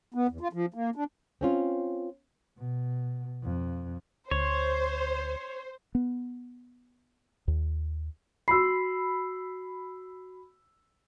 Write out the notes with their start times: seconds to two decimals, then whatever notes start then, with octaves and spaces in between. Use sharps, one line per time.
0.14 B3
0.29 E2
0.41 F4
0.53 F3
0.74 A#3
0.96 D4
1.41 C4 C#4 F4
2.58 B2
3.43 F2
4.31 D2 C5 C#5
5.95 B3
7.48 D#2
8.48 F#4 B5 E6 C7